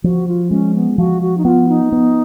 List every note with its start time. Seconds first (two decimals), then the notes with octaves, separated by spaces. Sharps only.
0.04 F3 F#4
0.27 F4
0.51 G#3 C#4
0.74 B3
0.98 F3 F#4
1.22 F#4
1.37 D#4
1.45 B3 F4
1.68 D#4
1.92 B3